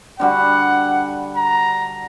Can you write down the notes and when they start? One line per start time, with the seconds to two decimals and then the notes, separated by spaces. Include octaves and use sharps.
0.20 D3 G3 F#4 F#5
1.36 A#5